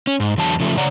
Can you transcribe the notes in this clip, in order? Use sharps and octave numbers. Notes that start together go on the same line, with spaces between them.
C#4
G#2
E2 D3 F#3 A5
C#3 F3 A3
C#3 C#5 D5 F#5 A#5